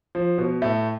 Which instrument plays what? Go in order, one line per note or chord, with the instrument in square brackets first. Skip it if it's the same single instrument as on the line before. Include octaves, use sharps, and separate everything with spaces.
[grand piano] F3
B2 B3
A2 A3